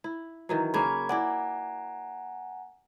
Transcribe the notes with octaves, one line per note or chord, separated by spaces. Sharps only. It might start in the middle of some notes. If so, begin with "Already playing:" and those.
E4
D#3 E3 F#3
C#3 A#3 C#4 B5 G#6
E4 D5 F#5 G#5 A#5